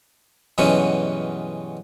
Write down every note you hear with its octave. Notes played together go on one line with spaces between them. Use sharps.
G2 B2 E3 F#3 G#3 C#4